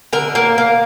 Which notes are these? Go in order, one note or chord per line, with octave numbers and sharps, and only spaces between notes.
D3 A#4
A#3
A#3